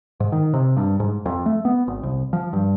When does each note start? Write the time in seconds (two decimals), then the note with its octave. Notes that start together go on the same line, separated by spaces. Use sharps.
0.20 G#2
0.32 D#3
0.54 C3
0.77 G2
1.00 G#2
1.26 F2
1.46 A3
1.65 B3
1.88 G#1
2.03 C2
2.33 F3
2.53 G2